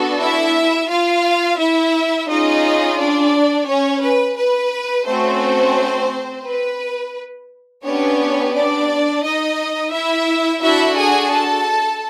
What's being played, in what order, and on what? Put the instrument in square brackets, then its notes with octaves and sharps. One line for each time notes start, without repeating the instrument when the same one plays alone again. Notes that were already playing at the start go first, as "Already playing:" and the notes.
Already playing: [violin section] B3 D4 F#4 A4
E4 E5
F4 F5
E4 E5
C#4 D#4 F4 G#4 D#5
D4 D5
C#4 C#5
B4
B4
A3 C4 C#4 F#4 C5
B4
B3 C#4 D4 G4 C#5
D4 D5
D#4 D#5
E4 E5
D4 E4 F#4 A4 E5
G#4 G#5
A4 A5